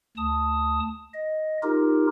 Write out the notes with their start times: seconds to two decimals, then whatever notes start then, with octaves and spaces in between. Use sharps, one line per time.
0.17 D2 A5 D#6
1.14 D#5
1.63 D#4 F4 G4 A#4